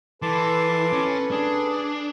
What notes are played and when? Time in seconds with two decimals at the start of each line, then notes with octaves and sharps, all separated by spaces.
0.22 E3 A4 B4 A5 C6 D6
0.93 C#4
1.31 D4 G#4